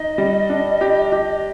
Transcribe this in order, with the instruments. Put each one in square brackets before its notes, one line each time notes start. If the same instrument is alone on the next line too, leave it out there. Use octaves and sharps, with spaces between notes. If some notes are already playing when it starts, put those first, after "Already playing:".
Already playing: [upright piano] D#4 [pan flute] D#5
[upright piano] G3
D4
G4
G4